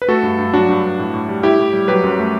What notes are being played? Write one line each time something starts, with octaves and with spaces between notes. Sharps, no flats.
B4
A3 F#4 A4
G2
G2
F#3 D4 F#4
G2
G2
A2
A2
G3
A2 E4 G4
A2
G3
F#3 G4 B4
F#2
A3